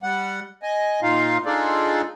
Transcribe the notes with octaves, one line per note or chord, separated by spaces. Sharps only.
G3 F#5
D#5 G#5
A#2 D#4 F4 F5
D4 D#4 F4 G#4 A4 D5